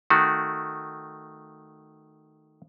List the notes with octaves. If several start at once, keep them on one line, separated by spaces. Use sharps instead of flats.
D#3 A3 F#4